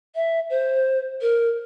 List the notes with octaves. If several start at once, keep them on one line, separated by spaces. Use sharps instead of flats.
E5
C5
A#4